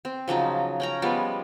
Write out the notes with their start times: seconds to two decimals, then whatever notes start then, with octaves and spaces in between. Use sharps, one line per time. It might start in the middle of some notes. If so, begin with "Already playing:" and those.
0.05 C4
0.28 C#3 F3 F#3 D#4
0.80 C#4 G5 A#5
1.02 F3 G3 G#3 B3